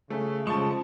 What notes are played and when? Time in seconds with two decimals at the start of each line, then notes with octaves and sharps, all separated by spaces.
0.10 C#3 A3
0.47 C#3 F3 G#3 A5 C#6